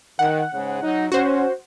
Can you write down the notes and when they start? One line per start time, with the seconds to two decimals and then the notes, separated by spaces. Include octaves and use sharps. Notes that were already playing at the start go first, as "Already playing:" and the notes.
0.19 D#3 F#5
0.53 G#2 C#3
0.82 F#3 D#4
1.12 C#4 F#4 C5